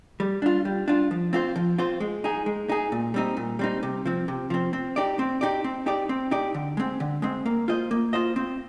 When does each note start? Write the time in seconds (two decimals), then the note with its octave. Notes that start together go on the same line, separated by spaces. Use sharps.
0.20 G3
0.42 D4 F4
0.65 G3
0.88 D4 F4
1.11 F3
1.33 C4 F4 C5
1.56 F3
1.78 C4 F4 C5
2.00 G#3
2.24 D#4 G#4
2.46 G#3
2.69 D#4 G#4
2.92 A#2
3.14 G3 C4 D#4
3.37 A#2
3.59 G3 C4 D#4
3.83 C3
4.06 F3 C4
4.28 C3
4.50 F3 C4
4.73 C4
4.96 D#4 G4 D5
5.19 C4
5.41 D#4 G4 D5
5.64 C4
5.86 D#4 G4 D5
6.09 C4
6.31 D#4 G4 D5
6.54 D3
6.77 G#3 C4
7.00 D3
7.22 G#3 C4
7.46 A#3
7.68 F4 C5 D#5
7.91 A#3
8.13 F4 C5 D#5
8.36 C4